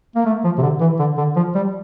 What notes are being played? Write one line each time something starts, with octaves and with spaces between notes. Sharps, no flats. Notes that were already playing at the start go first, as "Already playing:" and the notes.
A#3
A3
F3
C3
D3
E3
D3
D3
F3
G3